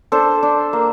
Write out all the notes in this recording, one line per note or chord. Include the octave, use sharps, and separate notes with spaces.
D4 A4 C5
D4
A#3